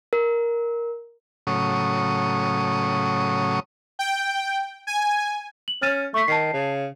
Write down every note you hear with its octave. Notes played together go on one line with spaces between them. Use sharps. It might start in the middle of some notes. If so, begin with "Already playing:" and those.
A#4
A2 C#3 F#3 C#6 D#6
G5
G#5
F#7
C#4 F6 A6 D#7
A3 C#6 B6
D#3 A5 C7
C#3